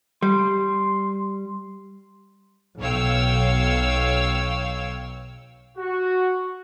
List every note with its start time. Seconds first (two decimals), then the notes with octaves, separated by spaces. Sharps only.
0.22 G3 C6
2.78 B1 C#5 F5 G5 E6
5.78 F#4